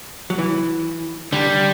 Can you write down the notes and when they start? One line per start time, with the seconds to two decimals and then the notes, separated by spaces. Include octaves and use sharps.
0.30 F#3
0.38 E3
1.32 D3 G3